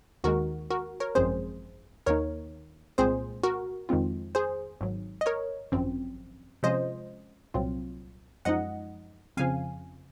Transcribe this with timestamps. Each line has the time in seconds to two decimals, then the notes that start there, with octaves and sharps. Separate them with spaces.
0.24 D#2 D#3 G#3 F#4 A#4
0.70 F#4 A#4
1.00 A#4 C#5
1.15 G#1 F#2 F3 G#3 C4 G#4 C5
2.06 D#2 D#3 A#3 D#4 A#4 C#5
2.98 C2 A#2 G#3 C4 G#4 C5
3.43 F#4 A#4
3.89 F2 D#3 G#3 C4 F4
4.35 G#4 C5
4.81 G#1 G#2 F#3
5.21 D#5
5.26 A#4 C#5
5.72 G#1 F#2 F3 C4
6.63 C3 F3 G#3 C#4 F4 C5 D#5
7.54 C2 A#2 F#3 C4 F4
8.45 F#2 F3 G#3 D#4 D#5 F#5
9.37 F2 C#3 F3 F5 G#5